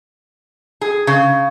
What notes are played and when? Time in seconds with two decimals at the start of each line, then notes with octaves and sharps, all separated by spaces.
0.81 G#4
1.07 C#3